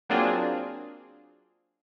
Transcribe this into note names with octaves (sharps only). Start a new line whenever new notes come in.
F#3 A#3 C4 D4 F4 G#4